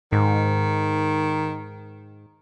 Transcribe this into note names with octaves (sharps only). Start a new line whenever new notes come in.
G#2 D#3